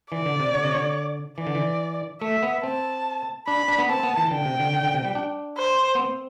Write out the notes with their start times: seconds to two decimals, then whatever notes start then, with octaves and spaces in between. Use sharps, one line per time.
0.12 E3 D5
0.26 D3
0.40 C3
0.54 D3
0.64 C3
0.75 D3
1.38 E3 D5
1.47 D3
1.55 E3
2.21 A3 E5
2.43 B3
2.63 C4 A5
3.48 D4 B5
3.68 D4
3.79 B3
3.89 C4 A5
4.03 B3
4.17 E3
4.31 D3 G5
4.45 C3
4.59 D3
4.73 D3
4.84 D3
4.94 C3
5.05 G3
5.15 D4
5.58 C5
5.95 B3
5.99 C4